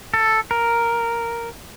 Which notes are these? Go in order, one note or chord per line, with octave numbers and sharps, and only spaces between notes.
A4
A#4